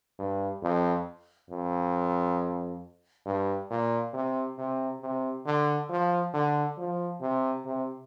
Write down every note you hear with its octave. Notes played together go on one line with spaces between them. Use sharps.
G2
F2
F2
G2
A#2
C3
C3
C3
D3
F3
D3
F3
C3
C3